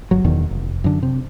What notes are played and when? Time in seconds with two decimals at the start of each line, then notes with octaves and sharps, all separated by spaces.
0.11 G1 F#3
0.24 E1 E2 B2 D#3
0.51 F1
0.84 F#2 D3
1.03 C3